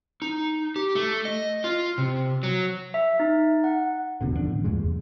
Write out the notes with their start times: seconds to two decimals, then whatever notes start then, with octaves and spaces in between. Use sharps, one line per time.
0.22 D#4
0.76 G4
0.95 A3
1.25 D#5
1.64 F4
1.98 C3
2.43 F#3
2.94 E5
3.20 D#4
3.64 F#5
4.21 F#1 D#2 B2 D3
4.33 D3 F3 A#3 D4
4.45 A1
4.64 E2 G2 A#2 G#3
4.82 F1